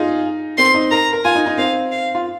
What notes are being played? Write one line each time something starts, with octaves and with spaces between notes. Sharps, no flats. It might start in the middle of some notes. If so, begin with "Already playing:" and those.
Already playing: D#4 F4 G#4
C4 C6
D#4
A#4 A#5
A#4
F4 G#5
D#4
D#4
C4 F5
F5
F4